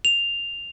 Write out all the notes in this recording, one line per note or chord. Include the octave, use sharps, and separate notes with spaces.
F7